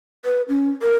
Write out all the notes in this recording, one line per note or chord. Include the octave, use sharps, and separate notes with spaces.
B4
C#4
A#4